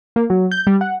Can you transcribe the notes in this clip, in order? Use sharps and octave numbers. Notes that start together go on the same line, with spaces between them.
A#3
F#3
G6
G3
F#5